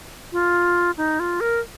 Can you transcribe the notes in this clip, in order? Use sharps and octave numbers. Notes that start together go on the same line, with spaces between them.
F4
D#4
F4
A#4